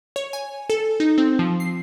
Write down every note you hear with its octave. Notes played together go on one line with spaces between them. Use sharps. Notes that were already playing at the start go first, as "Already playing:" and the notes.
C#5
G#5
A4
D#4
C4
F3
C7